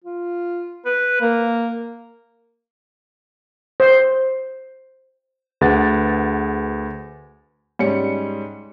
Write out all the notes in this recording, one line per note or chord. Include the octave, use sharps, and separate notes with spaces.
F4
B4
A#3
C5
D2 G#4 B4 F#5 A6
G#2 G3 C#4 C#7